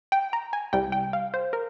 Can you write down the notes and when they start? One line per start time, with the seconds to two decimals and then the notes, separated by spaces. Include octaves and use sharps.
0.12 G5
0.33 A#5
0.53 G#5
0.73 C2 C3 G3 G5
0.92 G5
1.13 F5
1.34 C5
1.53 A#4